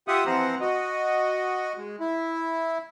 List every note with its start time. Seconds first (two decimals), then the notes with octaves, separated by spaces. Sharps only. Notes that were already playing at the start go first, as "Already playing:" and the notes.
0.08 F4 G4 E5 F#5 D#6
0.27 E3 F3 C4 C5 F#5 A#5
0.61 F#4 D#5
1.77 G#3
2.00 E4